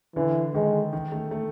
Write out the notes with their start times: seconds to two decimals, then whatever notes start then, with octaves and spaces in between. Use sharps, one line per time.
0.16 D3 E3
0.54 D#3 G#3
0.93 D#3
1.12 A3
1.31 A3